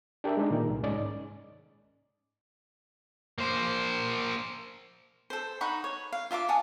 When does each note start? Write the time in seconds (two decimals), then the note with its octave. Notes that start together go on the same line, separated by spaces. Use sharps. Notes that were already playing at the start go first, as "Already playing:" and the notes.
0.24 D4 G4 A#4 D5 E5
0.37 G#3 D4 D#4
0.51 A#2 D#3 A#4
0.70 C2
0.83 G#2 C#4 D5 D#5
3.38 A#3 C5
5.30 A4 C5
5.61 D#4 F#5 B5 C#6
5.84 C#5
6.12 F5
6.31 F4 E5 A#5 D6
6.48 F#5 G#5 A5 D#6